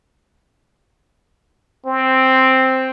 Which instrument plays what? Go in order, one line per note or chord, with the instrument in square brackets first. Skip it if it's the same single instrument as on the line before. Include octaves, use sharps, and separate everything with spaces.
[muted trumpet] C4